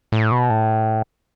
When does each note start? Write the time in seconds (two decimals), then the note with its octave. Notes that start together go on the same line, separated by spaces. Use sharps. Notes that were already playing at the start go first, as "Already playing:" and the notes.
0.12 A2
0.32 B2
0.50 A2